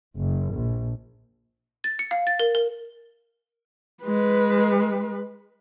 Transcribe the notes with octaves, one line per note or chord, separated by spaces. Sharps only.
F#1
A#1
A6
C#7
F5
A6
A#4
A#4
G#3 B4